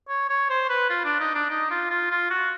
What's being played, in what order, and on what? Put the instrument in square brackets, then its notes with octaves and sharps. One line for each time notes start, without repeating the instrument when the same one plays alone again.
[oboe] C#5
C#5
C5
B4
F4
D4
D#4
D4
D#4
F4
F4
F4
F#4